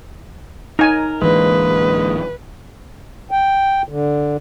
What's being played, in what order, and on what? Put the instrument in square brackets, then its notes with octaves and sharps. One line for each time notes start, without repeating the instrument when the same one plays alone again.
[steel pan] D#4 G#5 [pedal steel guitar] A#4
[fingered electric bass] D1 E3 D4 [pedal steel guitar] G#3 A#3 [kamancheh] B4
[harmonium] G5
D3